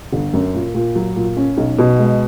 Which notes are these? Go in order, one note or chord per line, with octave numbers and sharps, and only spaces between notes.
G1
F#2
A#2
A#2
F#3
A#2
C#4
B1
B2
G#3